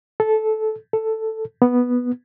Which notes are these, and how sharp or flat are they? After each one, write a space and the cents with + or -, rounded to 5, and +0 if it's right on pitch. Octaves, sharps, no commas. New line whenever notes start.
A4 -15
A4 +5
B3 -5